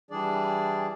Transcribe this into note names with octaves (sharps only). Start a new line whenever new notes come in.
E3 G3 D4 G#4 D5